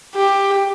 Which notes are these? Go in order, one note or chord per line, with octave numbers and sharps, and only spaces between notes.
G4